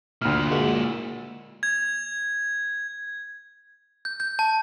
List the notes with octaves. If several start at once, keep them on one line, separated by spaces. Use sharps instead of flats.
D2 A#2 E4 F6
G#3 A#3 F#4
G#6
G6
G6
A5